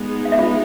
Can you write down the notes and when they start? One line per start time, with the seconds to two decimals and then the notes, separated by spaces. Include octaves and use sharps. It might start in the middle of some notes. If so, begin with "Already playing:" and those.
Already playing: G#3 B3 D#4 G#4
0.25 F5
0.32 E5
0.39 F4 F5